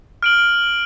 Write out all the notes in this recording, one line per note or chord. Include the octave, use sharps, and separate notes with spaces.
F6 D7 F#7